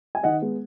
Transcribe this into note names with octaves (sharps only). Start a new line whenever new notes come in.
G#5
D#3 D#5 F#5
G#3 B3